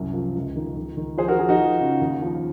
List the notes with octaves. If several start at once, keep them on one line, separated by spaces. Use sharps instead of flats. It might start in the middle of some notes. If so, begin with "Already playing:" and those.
Already playing: C2 F#2
F3
C#2
D#3
D#3
D#3
F3 G#4 C5
F#4 A#4
F3 G#4
D#4 F#4
F3
C#3
D#2
F3